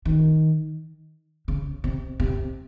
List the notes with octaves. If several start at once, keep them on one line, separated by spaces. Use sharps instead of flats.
D#3
C#3
C3
C3